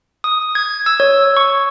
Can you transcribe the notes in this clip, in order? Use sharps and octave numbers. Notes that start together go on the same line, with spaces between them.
D#6
G#6
E6
C#5
C#6